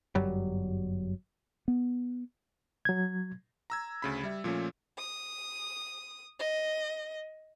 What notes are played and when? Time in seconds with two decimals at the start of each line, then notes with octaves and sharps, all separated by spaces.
0.15 G1 F#2 F#3 G3
1.68 B3
2.85 F#3 G#6
3.70 A#5 E6 G#6
4.02 D2 C#3 B5
4.23 G3 E5
4.44 A#2 F3 A3 C#4
4.98 D#6
6.39 D#5